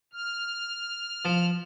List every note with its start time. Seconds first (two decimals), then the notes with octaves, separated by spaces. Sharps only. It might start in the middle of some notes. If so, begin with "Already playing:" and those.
0.13 F6
1.25 F3